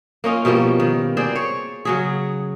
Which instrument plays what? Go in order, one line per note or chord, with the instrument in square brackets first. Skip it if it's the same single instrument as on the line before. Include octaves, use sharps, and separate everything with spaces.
[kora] A#3 C#4 D#4 F4
B2 F3 G3 A#3
D#3
C4 G#4 C5 D5
C#5
C#3 F#3 G#4